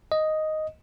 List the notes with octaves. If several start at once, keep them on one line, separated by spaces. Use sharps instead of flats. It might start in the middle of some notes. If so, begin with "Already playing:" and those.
D#5